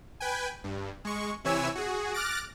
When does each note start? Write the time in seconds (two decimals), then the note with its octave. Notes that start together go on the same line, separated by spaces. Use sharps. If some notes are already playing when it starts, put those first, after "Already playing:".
0.20 B4 G5 G#5
0.64 G2
1.05 G#3 C#6
1.44 C3 E3 E4 C#5 G#5 E6
1.75 F#4 G#4
2.14 D6 F6 F#6 A6 A#6 D7